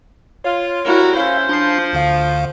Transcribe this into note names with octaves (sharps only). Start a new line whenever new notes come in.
F4 C#5
G3 E4 F#4 A#4
C#4 E4 C5 F5
F3 D4 C6 C7
D2 D3 F5